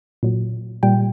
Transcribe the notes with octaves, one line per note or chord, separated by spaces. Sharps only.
A#2 F#3
A#2 G3 G5